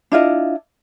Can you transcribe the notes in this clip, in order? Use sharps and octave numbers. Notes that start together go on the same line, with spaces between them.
D4 E4 F4 D#5